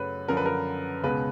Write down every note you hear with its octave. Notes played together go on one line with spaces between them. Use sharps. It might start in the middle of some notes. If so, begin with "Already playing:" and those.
Already playing: F#2 C#3 F#3 A3 B4
F#2 D3 F3 A#4
B4
A#4
C#2 B2 G#3 B4